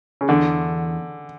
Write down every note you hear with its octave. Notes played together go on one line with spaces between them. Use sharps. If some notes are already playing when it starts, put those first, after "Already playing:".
C#3
E2 D3